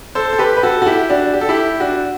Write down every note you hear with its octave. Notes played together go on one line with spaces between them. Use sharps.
A4 C5
A4
G4 B4
B4
F#4 A4
F#4
E4 G4
D4 F#4
G4
A4
E4 G4
D4 F#4